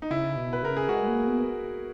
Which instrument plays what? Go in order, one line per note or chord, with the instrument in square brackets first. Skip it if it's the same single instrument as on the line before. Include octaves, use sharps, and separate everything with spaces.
[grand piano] D#4
[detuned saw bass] C#3 [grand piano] E4
[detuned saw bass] B2
[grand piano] B4
[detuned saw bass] C#3 [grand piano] A#4
[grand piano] G#4
[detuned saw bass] G#3 [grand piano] F#4
[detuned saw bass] G#3
A#3
B3